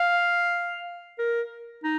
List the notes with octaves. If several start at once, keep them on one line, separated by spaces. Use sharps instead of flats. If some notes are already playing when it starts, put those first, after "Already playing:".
Already playing: F5
A#4
D#4